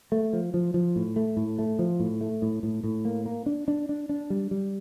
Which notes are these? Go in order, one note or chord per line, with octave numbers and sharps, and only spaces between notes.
A3
F3
F3
F3
A2
A3
A2
A3
F3
A2
A3
A2
A2
A2
A#3
A#3
D4
D4
D4
D4
G3
G3